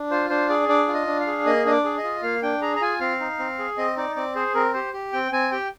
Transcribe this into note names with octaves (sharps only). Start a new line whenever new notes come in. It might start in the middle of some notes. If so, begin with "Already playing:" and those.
Already playing: D4
F4 C5
D4 C5
G#4 D5
D4 D5
F4
D#5
D4
F5
G#4
A#3 D#5
D4 D#5
D5
G#4
D#5
F4
A#3 F5
D4 G5
G#4 A#5
A#5
F4 G#5
C4 F5
D#4
C4
G#4
C4 D#5
D#4 D5
C4 D5
G#4 C5
C4 A#4
G4 C5
G4
C4 G5
C4 G#5
G4 G5